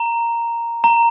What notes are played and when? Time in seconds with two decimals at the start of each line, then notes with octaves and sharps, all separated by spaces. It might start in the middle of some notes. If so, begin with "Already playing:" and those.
Already playing: A#5
0.84 A#5